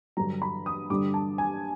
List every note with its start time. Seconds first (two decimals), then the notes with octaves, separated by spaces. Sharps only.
0.17 G2 D3 F#3 A#5
0.42 B5
0.66 D#6
0.90 G2 D3 G3 D6
1.14 A5
1.38 G#5